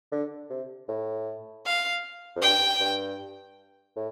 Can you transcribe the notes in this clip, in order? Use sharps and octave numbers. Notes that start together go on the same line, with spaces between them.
D3
C3
A2
F5
F2
G2 G5
G2
A2